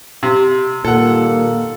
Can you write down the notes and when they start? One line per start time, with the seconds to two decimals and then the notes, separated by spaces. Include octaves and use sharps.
0.23 C3
0.85 G2 A#2 D#3 A#3 A4 F#5